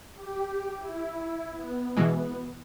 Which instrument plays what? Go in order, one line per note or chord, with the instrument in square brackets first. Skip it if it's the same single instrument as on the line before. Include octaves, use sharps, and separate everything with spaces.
[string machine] G4
E4
B3
[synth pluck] B2 E3 G#3